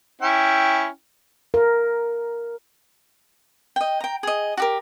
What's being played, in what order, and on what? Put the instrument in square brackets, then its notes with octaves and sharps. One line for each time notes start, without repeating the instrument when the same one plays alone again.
[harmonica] C#4 E4 G5
[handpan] A#4
[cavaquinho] D#5 G5
G5 A#5
G#4 D#5
F#4 G4 A#4